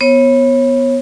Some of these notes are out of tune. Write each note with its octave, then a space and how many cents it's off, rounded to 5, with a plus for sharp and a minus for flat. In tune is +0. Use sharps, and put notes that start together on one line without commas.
B3 +0 C#5 -30